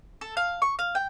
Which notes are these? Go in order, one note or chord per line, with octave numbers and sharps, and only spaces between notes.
A4
F5
C#6
F5
G5